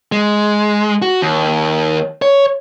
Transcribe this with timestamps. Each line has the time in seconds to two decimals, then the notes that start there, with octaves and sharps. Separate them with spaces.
0.12 G#3
1.02 F#4
1.22 D#2
2.22 C#5